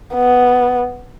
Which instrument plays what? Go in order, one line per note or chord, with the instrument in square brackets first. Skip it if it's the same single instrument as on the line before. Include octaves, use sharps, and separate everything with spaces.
[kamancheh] B3